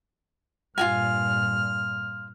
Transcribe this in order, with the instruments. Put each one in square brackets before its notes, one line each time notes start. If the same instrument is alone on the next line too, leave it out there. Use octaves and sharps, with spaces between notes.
[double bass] G2 A#2 [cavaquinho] F4 F#4 G#5 [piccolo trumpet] F6